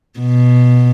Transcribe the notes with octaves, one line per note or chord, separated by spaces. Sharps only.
B2